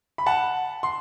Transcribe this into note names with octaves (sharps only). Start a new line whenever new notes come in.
B5
F#5 A5
C6